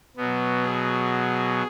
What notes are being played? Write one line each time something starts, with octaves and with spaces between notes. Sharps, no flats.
B2 F#3 B3
G#4